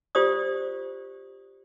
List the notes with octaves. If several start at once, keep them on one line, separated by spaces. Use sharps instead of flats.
F4 G4 C5 D5 D#6